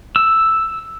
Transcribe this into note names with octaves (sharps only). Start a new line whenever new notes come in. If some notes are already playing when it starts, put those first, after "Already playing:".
E6